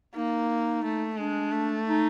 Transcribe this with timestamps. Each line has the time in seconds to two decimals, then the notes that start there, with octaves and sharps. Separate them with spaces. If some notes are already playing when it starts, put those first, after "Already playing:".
0.16 A#3 D#4
0.84 A3
1.18 G#3 D4
1.52 A3
1.87 D#4